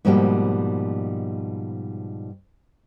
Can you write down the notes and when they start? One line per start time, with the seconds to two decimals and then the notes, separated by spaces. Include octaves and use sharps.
0.05 G#2 B2 F3 G3 A#3 G5